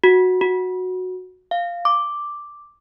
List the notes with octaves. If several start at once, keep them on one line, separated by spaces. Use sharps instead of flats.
F#4
F#4
F5
D6